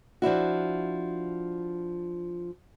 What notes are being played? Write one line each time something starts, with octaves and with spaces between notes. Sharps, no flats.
F3 D4 E4 F#4